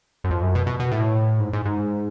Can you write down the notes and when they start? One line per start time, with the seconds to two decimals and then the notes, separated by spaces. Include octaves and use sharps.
0.24 F#2
0.31 F2
0.43 F#2
0.55 B2
0.67 B2
0.80 B2
0.92 A2
1.40 G#2
1.53 G#2
1.65 G#2